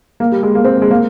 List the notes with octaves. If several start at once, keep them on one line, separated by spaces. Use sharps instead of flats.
A#3
G3
G#3
A#3
C4
G#3
A#3